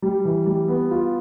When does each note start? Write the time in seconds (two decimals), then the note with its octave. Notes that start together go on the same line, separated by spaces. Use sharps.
0.02 G3
0.25 E3
0.46 G3
0.68 B3
0.91 F4